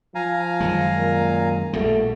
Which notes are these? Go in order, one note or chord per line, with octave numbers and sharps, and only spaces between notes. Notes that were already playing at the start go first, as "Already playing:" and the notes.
F3 F5 G#5 A#5
F#2 D#3 G#3
A#2
A#1 B2 G3 A3